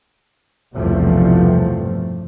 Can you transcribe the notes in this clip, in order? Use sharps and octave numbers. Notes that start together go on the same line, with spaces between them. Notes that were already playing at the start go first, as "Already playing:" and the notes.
B1 E2 G2 C3 F3 A3